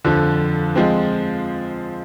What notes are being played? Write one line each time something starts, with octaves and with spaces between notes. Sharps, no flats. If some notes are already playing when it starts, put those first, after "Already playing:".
F2 D3 F3
F3 G#3 C4